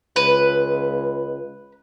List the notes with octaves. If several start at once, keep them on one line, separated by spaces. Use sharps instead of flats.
C#2 B4